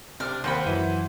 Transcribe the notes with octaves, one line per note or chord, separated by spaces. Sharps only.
C3 D4 F6
D#2 A#3 C5 F#5 B5
F#2 E3 F#3 E4 D#7